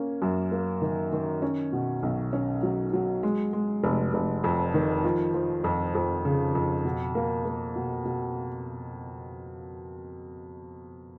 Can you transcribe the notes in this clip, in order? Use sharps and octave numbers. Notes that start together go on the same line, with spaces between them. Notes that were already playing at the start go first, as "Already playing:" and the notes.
Already playing: A#3 C#4
F#2
A#3
D#3
D#3
C#4
B2
B1
C#4
F#3
F#3
G#3
G#3
F1
F1
F2
D#3
F3
F3
F2
F2
C#3
F2
B2
A#3
A#3
B2
B2